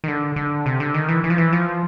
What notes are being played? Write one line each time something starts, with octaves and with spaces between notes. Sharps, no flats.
D#3
D3
D3
C3
D3
D#3
E3
E3
F3
E3
F3